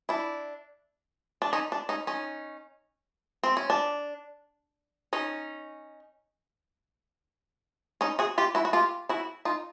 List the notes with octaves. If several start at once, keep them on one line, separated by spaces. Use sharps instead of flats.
D4 E4
D4
C#4 D#4
D4
C#4 D#4
C#4 D#4
C4
C#4
D4
C#4 D#4
C#4 D#4
F#4 G#4
F4 G4
E4 F#4
F#4
F4 G4
E4 F#4
D#4 F4